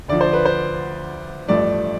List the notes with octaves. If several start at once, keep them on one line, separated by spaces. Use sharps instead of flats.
D2 D3 F3 D5
C5
B4
C5
A1 G2 F3 A3 D5